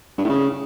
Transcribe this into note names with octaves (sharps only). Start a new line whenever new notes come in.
G2
A2
C#3